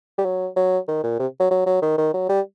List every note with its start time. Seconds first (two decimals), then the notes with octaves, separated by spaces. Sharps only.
0.18 G3
0.25 F#3
0.57 F#3
0.88 D#3
1.04 A#2
1.20 C3
1.40 F#3
1.51 F#3
1.66 F#3
1.82 D#3
1.98 D#3
2.14 F#3
2.29 G3